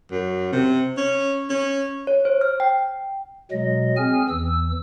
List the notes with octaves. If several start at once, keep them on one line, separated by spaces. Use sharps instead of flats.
F#2
C3
C#4
C#4
C#5
C5
F6
G5
B2 F#3 G#3 D#5
C4 G#4 G#5 F6
E2 E3 E6